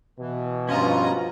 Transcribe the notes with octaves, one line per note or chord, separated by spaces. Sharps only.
B2 E3
G2 F3 C#4 F4 D#5 A#5